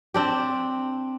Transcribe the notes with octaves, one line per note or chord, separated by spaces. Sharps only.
C4 D4 G4